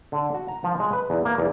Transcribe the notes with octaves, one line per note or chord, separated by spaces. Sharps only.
D3
F#4
A#5
F3
G#3
B4
E2
A#3
E2